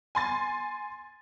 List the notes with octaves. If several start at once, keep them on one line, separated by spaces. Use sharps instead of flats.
G#5 C6 A6